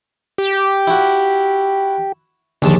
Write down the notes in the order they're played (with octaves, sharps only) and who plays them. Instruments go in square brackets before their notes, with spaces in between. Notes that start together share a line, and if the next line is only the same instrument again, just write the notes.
[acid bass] G4
[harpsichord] E4 F#4
[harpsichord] A#1 D#2 A5 [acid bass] D3